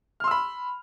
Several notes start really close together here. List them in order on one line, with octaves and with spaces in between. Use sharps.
F6 C6 E6 B5